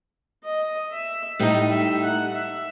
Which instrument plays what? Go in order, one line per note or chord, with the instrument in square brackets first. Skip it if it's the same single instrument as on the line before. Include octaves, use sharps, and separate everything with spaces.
[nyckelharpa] D#5
E5
[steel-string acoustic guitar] A2 G3 D#4 [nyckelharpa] D#5
[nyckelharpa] E5
F#5
E5